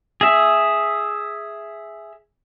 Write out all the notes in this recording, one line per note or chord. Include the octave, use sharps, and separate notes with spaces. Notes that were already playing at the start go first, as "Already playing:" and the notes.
G#4 E5